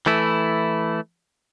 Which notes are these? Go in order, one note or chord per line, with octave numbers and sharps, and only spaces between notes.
E3 A3 E4